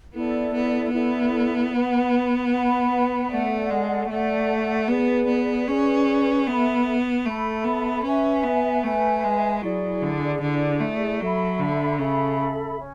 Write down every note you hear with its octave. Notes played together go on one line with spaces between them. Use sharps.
B3 E4 A4 D5
B3
B3 E4 A4 D5
B4 F#5 B5
B4 F#5 B5
A3 A4 D5 F#5
G#3
A3 A4 D5 F#5
B3 G#4 B4 D5
B3
C#4 G#4 B4 D5
B3 A4 E5 B5
A3 A4 E5 B5
B3
C#4 B4 E5 G#5
B3
A3 B4 E5 G#5
G#3
F#3 E4 G#4 D5
D3
D3 E4 G#4 D5
A3
F#3 A4 E5 B5
D3
C#3 A4 E5 B5
C#4